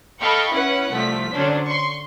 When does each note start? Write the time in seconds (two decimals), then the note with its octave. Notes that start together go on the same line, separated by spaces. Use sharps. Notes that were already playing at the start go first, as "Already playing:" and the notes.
0.20 A4 D#5 F5 G5 B5 C#6
0.52 C#4 E4 B4 F#5
0.91 C2 F3 A3 B6
1.32 D3 F#3 C#4 D4 C5
1.66 C6 C#6